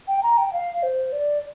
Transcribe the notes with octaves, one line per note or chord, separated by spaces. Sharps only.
G5
A#5
G5
F5
C5
D5